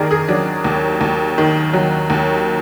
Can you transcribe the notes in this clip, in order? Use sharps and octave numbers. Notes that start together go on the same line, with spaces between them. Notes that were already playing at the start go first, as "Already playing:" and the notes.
Already playing: D#2 D#3 G#4 A#4 D5
G#4
F#3 D4
D#2
D#2
D#3
F#3
D#2